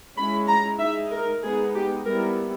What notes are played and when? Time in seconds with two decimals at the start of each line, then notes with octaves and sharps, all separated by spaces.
0.17 G#3 C#4 E4 B5
0.48 A#5
0.79 G#3 D#4 E5
1.11 A#4
1.42 G#3 B3 D#4 G#4
1.74 G4
2.05 G3 B3 E4 A#4